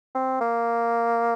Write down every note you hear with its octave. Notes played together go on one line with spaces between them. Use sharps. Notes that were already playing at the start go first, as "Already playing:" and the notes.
C4
A#3